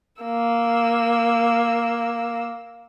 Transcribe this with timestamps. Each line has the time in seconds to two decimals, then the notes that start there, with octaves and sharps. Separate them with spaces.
0.22 A#3 E6